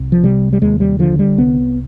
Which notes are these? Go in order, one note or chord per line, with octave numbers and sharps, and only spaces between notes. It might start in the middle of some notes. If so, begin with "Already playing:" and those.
Already playing: C2
F3
C3 G3
G3
D#2 G#3
G3
D3 F3
G3
C2 B3